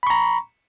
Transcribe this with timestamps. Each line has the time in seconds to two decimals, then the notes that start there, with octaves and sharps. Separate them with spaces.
0.03 B5
0.07 C#6
0.10 A#5